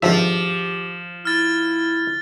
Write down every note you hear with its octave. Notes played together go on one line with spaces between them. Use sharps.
G#1 G2 F3 G4 E5
E4 F6 A6